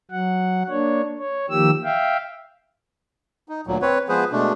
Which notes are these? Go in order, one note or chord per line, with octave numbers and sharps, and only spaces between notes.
F#3 F#5
A#3 D4 C#5
C#5
D#3 F3 A#3 G4 E6
E5 F5 G5
D#4
D2 A#2 F#3
C4 B4 C#5
F3 G#3 B3 G#4 B4 C5
B2 G#3 A3 D4